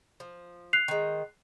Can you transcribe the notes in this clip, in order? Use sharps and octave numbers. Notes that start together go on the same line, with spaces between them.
F3
F#6 C7 F7
D#3 G#3